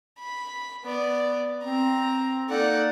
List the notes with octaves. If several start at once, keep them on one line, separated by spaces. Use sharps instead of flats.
B5
B3 D5
C4 A#5
A#3 D#4 A4 D5 F#5